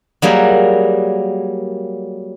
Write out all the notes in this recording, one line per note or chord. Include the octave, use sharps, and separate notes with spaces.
F#3 G3 A#3 G#4